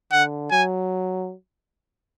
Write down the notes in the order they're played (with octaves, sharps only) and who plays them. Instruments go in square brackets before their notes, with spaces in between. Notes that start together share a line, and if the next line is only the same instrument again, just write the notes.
[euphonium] D3 [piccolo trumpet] F#5
[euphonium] F#3 [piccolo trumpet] G#5